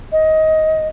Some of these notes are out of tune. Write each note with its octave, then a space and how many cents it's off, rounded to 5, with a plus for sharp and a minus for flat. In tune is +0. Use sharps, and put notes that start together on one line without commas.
D#5 +15